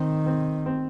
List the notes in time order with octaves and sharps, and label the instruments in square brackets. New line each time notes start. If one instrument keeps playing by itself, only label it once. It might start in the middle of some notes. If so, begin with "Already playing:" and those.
Already playing: [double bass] D#3 [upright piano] C4
[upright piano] C4
C4